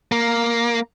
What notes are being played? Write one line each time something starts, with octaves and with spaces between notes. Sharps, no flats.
A#3